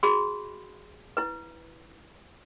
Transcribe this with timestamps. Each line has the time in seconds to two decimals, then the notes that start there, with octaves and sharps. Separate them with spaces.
0.03 F#4 G#4 B5 C6
1.17 E4 B4